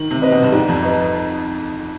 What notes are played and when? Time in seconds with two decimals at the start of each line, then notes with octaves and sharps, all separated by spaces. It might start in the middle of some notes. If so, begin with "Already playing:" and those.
Already playing: D#3
0.11 C3
0.21 C4 D#4 B4 D#5
0.32 B2
0.42 G2
0.52 G#2 G3
0.68 F2
0.83 B4 D#5